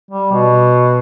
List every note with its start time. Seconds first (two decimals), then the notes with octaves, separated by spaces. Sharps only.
0.11 G3
0.32 B2